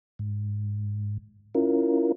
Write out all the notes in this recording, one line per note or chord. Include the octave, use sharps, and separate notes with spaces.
G#2
C#4 E4 F4 A#4